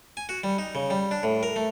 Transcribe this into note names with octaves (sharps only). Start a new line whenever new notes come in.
G#5
F#4
G3
D#4
C#3
G3
D4
A2
A#4
A3